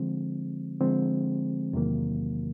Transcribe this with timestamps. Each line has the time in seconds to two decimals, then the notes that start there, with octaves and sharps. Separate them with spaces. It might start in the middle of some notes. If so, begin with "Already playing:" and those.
Already playing: D3 F3 G#3 C4
0.81 D3 F3 G#3 C4
1.73 E2 C3 D#3 F#3 A#3